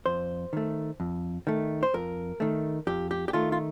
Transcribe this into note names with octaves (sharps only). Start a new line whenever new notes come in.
F2 C5
D#3 A3
F2
D#3 A3
C5
F2 A#4
D#3 A3
F2 G4
G4
G4
D#3 A3 F4
F4